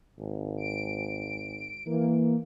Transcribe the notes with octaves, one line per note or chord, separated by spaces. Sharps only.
G#1
D7
E3 A#3